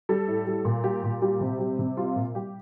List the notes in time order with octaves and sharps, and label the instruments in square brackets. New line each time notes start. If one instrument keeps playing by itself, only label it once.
[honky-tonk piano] G3 A4
A2
G3
A#2
G3 G4
A#2
G3 G4
C3
G3
C3
G3 F4
A#2
G3 G4